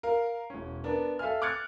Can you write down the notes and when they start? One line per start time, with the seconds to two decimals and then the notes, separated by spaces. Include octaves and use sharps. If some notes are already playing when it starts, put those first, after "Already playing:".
0.03 A#4 F5
0.50 E1 C#4
0.84 B3 D4 A#4
1.19 A4 E5 F5 G#5 F6
1.42 D6 F6 F#6 G#6 A6 C#7